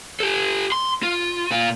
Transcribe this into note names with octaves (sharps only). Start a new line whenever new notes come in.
G4 A4
C6
F4
A#2 F4